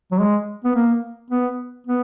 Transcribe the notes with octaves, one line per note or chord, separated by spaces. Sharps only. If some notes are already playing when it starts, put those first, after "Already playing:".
F#3
G#3
B3
A#3
B3
B3